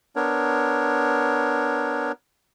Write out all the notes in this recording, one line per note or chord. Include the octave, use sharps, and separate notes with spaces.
B3 D4 A#4 C#5